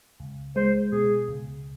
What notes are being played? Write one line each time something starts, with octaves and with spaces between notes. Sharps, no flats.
C#2
G#3 C5
B2 G#4
C#2